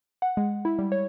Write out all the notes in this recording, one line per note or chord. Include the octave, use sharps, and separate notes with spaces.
F#5
G#3
E4
G3
C#5